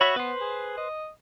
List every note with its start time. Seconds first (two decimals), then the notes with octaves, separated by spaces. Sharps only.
0.01 F#4 C#5 E5 B5
0.16 B3 B4 C5
0.41 G#4
0.77 D#5